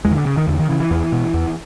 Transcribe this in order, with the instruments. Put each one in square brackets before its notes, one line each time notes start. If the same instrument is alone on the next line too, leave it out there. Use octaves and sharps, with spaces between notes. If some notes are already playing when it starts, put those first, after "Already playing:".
[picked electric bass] E2 G#3
D#3
D3
C#3
D#3
E2 D3
D#3
C#3 E3
E3
E2
B2
E2